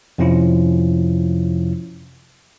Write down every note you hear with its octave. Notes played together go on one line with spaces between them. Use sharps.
F2 C3 F3 C#4 E4 F4